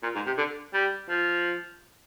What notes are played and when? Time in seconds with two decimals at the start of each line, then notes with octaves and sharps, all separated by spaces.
0.03 A#2
0.15 G#2
0.26 C3
0.37 D3
0.74 G3
1.09 F3